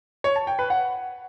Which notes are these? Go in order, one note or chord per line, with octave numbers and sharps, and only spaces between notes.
C#5
A5
G5
B4
F#5